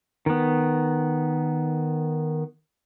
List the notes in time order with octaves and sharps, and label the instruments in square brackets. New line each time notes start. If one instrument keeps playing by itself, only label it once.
[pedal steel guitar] D#3 B3